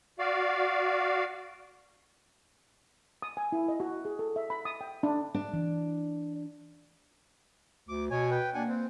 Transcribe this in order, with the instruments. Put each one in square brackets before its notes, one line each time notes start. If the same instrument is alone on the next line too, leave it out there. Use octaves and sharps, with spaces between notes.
[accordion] F#4 D5 F5
[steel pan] D#6
G#5
E4
D#5
F#4
G#4
A4
E5
B5
D#6
G5
D4
[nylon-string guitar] D4
[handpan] E3
[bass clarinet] D2 [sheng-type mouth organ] D6
[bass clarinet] B2 [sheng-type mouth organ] C#5 G#5
[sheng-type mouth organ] B4 G5
[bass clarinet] A#3 [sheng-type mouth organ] D4 F#5 G#5
[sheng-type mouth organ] C4